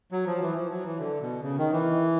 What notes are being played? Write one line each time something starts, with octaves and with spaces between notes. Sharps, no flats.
F#3
F3
E3
F3
F#3
E3
D3
B2
C#3
D#3
E3